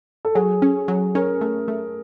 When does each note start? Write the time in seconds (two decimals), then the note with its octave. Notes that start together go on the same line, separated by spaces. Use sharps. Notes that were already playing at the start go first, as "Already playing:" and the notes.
0.25 A4
0.35 F#3 G#4
0.62 C#4
0.88 F#3
1.15 C#4 A#4
1.41 A3
1.68 A3